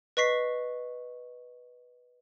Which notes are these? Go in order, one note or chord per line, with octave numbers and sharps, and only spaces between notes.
B4 D#5 C#6 B6 C7